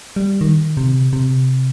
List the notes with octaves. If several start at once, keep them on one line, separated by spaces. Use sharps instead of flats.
G3
D#3
C3
C3